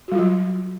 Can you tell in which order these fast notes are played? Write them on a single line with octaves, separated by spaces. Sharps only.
F#4 G3 F4 F#3